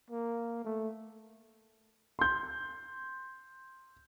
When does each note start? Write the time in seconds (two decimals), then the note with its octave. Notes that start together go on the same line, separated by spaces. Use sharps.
0.10 A#3
0.65 A3
2.19 C6 G6